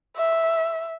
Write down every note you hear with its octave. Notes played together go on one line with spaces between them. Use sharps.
E5